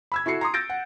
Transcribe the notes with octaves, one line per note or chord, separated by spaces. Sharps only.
B5 E6 G#6
E4 F#4 A4 C7 C#7
A#5 C6 D#6
E6 G6 A6 A#6 D7
F#5